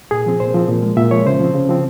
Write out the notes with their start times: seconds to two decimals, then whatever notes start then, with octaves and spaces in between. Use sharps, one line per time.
0.11 A#2 G#4
0.26 F3 C4
0.40 A#2 C5
0.54 F3 C4
0.69 A#2
0.83 F3 G#3
0.97 A#2 E5
1.11 F3 G#3 C#5
1.26 C#3 C5
1.40 F3 C4
1.55 C#3
1.69 F3 C4